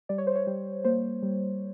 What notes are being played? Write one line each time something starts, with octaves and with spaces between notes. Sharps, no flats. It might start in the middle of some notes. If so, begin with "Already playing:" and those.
G3 D5
C#5
C5
C#5
G3
A#3 C5
G3